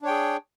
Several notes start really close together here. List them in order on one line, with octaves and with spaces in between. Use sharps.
D4 C#5 G5 G#4